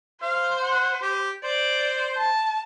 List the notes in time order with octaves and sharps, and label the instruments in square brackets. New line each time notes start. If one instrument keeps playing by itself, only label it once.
[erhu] C5 [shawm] F5
[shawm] F#5
G4
[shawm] C5 [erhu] D5
[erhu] A5